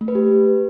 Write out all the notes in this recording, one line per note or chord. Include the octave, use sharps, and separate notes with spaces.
A3
B4
G4